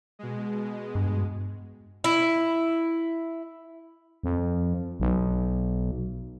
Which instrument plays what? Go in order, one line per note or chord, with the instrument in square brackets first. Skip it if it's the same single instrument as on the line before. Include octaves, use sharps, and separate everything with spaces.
[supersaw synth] B2 G#3
[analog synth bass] G2
[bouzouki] E4
[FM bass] F2
B1